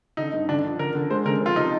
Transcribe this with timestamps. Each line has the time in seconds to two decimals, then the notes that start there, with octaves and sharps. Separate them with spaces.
0.17 D3 D#4
0.33 G2
0.49 D3 D4
0.63 F3
0.79 D3 A#4
0.95 D3
1.10 G#3 C5
1.25 D3 A#4
1.41 F2
1.46 F4
1.56 C3 D#4